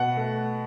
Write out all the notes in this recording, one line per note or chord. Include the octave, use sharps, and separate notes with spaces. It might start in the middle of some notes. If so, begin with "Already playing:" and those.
Already playing: B2 F#5
A3